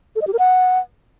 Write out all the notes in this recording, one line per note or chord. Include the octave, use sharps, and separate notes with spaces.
A4
D#5
G4
A#4
F#5